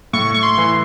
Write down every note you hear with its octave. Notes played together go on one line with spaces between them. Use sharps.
A2 C#6
C#6
C6
E3